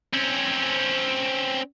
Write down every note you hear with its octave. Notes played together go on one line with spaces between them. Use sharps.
C4 C#4